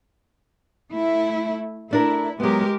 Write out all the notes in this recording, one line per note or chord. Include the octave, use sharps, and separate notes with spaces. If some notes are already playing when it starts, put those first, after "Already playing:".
A3 E4
A3 D4 E4 A#4
F#3 G#3 B3 G4 A#4